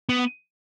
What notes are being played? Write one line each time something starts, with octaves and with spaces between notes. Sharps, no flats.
B3